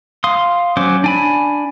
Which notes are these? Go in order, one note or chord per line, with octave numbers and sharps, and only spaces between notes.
F5 C6 D#6
F#3 C#4 C5 D6
D4 G#5 B5